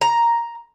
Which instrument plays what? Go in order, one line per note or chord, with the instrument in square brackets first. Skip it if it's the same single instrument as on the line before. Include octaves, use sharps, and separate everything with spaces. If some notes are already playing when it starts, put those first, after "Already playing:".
[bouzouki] A#5